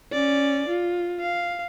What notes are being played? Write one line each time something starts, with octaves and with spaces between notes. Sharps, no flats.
C#4 D5
F4
F5